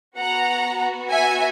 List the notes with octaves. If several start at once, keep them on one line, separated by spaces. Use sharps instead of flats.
B3 F#4 F#5 A#5
E5 G#5